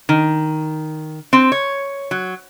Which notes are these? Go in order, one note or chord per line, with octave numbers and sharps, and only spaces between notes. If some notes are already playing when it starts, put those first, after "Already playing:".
D#3
C4
C#5
F#3